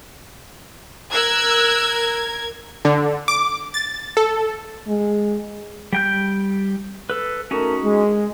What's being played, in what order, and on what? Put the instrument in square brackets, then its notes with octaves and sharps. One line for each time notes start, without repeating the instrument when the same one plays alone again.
[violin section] A#4 G#6 [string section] E6 F#6
[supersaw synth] D3
D6
A6
A4
[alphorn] G#3
[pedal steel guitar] G3 G5 G6
A4 B4
[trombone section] A3 A4 A#4 [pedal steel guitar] C#4 D#4 F#4
[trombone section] G#3